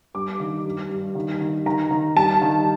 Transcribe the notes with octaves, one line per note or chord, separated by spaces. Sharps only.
G2 D6
D#3
G2
G2
D#3
D#3
D#3 A#5
D#3
G2 A5
D#3